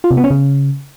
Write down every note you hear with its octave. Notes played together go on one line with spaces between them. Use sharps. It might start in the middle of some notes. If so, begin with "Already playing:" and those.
F4
C3
B3
C#4
C#3